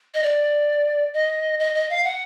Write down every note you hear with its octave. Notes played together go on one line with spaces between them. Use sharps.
D#5
D5
D#5
D#5
D#5
F5
F#5